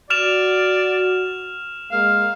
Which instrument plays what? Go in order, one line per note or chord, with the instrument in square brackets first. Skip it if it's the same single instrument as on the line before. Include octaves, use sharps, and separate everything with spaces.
[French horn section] F#4 [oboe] D5 [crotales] F6 E7 F7
[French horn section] G#3 A#3 [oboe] F5